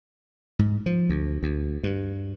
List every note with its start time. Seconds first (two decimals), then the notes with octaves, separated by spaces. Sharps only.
0.59 G#2
0.86 F3
1.09 D2
1.43 D2
1.83 G2